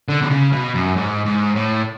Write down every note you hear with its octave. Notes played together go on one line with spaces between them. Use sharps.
D3
B2
C#3
B2
F#2
G#2
G#2
A2